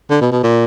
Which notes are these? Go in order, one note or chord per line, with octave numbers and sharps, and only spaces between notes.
D3
B2
B2
A#2